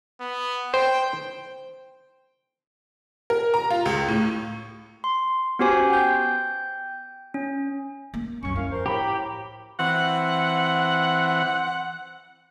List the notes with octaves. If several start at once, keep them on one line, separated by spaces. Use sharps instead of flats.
B3
C5 G5
A#4
A#5
F4
C#2
A2
C6
B3 C#4 F#4 G4 C5 G#5
G5 G6
C#4
A#3
C2 F#2 C#4 C#6
F#2 E4 F5
F3 A#4 C5
A2 G4 A#5 B5
E3 C4 F#5